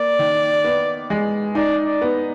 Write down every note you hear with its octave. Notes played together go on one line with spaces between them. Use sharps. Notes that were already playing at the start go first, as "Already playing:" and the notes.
Already playing: A#3 D5
D#3
B3
G#3
D#4 D5
D5
B3